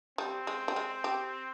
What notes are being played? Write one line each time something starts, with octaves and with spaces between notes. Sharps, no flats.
G3 C4
G#3
G3
G#3
G4